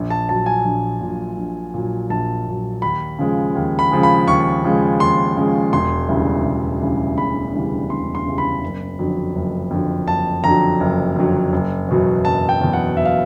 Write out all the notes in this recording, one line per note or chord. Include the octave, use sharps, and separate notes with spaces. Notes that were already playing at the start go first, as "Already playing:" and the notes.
Already playing: A#1
A5
A#2 F#3 A5
G#5
A#1
A#2 F#3
A#1
A#2 F#3
A#1 A5
A#2 F#3
D#2 B5
C#3 F3 G#3
D#2
B5
C#3 F3 G#3
B5
D#2 C#6
C#3 F3 G#3
D#2 C6
C#3 F3 G#3
E1 C6
D2 C#3 E3 G3
E1
D2 C#3 E3 G3
E1 B5
D2 C#3 E3 G3
E1 C6
C6
D2 C#3 E3 G3
B5
F#1
F2 D3 F#3
F#1
F2 D3 F#3
F#1 A5
F2 D3 F#3 A#5
F#1
F2 D3 F#3
F#1
E2 B2 F#3
F#1 A5
G5
E2 B2 F#3
F#5
F#1 E5
F5